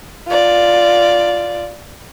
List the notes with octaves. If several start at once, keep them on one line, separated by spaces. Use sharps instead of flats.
F4 D5